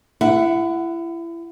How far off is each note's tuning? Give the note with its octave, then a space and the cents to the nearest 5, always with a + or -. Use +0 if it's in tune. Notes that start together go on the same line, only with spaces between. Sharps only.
E4 +30 F#5 +0